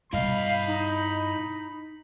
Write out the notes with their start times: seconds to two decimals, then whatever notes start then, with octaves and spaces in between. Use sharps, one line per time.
0.13 G2 B2 E4 D#5 F5 B5
0.66 D#4